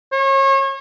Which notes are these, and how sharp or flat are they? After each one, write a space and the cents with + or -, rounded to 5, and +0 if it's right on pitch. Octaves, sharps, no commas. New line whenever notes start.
C#5 -35